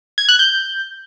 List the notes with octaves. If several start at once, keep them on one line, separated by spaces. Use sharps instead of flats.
G#6
F#6
G6